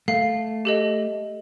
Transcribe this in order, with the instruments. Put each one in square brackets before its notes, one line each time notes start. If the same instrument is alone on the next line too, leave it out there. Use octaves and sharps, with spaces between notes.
[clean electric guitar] A3 [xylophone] F5 C7
[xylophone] G4 A4 D#5